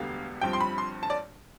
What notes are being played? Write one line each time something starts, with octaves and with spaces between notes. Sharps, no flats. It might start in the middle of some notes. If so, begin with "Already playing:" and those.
Already playing: E1 D2 D3 G3 B3 F5
G1 G2 F3 C4 G5
C6
B5
C6
A5
D5